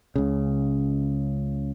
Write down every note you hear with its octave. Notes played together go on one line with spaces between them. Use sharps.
C#2 C#3